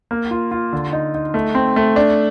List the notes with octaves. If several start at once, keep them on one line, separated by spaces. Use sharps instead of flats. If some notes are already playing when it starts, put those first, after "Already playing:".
A#3
F4
F4
D3
D#4
D#4
A3
C4
A3
D4